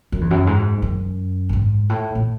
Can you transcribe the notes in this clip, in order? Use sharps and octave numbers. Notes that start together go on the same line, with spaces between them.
F#2
E2
F#2
G#2
F#2
A2
G#2
A2
A2